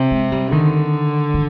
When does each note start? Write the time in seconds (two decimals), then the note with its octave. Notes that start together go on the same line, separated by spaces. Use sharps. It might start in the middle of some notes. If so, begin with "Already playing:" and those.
Already playing: C3
0.11 G#3
0.32 G3
0.52 D3 D#3
1.34 D#3